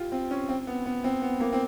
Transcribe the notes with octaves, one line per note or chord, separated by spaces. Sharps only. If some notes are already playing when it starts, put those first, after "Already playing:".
Already playing: F4 G4
C4
C#4
C4
B3
B3
C4
B3
A#3
C4